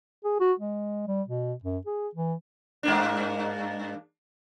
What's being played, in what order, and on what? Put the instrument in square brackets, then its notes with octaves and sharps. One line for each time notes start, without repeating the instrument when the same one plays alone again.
[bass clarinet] G#4
F#4
G#3
G3
B2
F#2
G#4
E3
[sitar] G2 A#3 D4